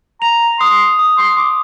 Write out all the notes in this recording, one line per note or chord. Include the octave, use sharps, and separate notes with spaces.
A#5 F7
C6 D#6
D#6
C6
C6 D6